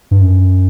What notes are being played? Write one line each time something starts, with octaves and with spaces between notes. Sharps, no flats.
G2
F#2